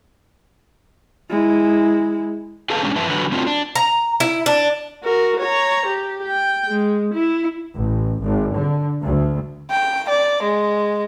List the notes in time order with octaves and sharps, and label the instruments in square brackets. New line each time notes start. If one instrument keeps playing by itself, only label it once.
[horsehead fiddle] G#3 E4
[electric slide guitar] G#4 A4 B4 F5 A5
G3 G#3 C#4 D4
G2 F3 B4 E5 A5
D3 F#3 F#4 B4
A3 C4 D4 F4 F#4
D4
[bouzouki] A#5
E4
D4
[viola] F#4 A#4
C#5 A#5
G4
G5
G#3
E4
[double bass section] A1
G#1
D3
D2
[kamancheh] G5
D5
G#3